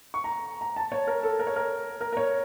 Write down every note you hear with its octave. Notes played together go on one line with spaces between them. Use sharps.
C#6
A#5
A#5
A5
C#5
A#4
A4
A#4
C#5
A#4
A#4
A#4
C#5